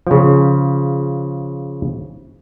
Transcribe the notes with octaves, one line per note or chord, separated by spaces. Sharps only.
C#3 F3